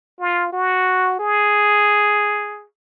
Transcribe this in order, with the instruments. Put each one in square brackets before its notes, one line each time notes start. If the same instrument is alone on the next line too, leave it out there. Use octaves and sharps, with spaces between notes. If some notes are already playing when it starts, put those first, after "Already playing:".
[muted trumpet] F4
F#4
G#4